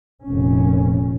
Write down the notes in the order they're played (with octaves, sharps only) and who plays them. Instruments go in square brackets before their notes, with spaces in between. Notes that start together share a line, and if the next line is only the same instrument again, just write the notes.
[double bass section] F1 A#2 C#4